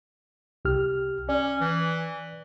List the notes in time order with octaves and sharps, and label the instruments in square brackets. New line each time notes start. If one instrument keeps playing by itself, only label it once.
[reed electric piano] C2 G4 F6
[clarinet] C#4 [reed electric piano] D5
[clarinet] E3